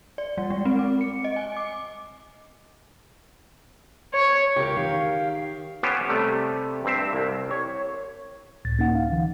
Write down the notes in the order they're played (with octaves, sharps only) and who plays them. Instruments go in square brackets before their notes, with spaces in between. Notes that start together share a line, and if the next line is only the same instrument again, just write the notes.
[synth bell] D5
G3
G#3
C4
D6
C#7
D#5
G#5
D6
[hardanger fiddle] C#5
[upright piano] C#2 [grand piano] G4 A#4 C#5
[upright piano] D#3 [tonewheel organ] F5
[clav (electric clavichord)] B3 C#4 G4 C5
C3 G3 A3
G2 C4 E5
C2
C#5
[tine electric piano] C#2 A2 A6
A#3 C#4 D#4 F#5
F5
D3 E3 F#3